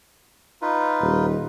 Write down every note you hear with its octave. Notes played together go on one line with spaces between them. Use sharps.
D#4 F4 B4
D#1